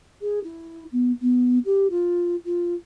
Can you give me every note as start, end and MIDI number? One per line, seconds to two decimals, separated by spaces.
0.22 0.39 68
0.44 0.84 64
0.92 1.12 59
1.22 1.59 59
1.65 1.87 67
1.90 2.36 65
2.45 2.74 65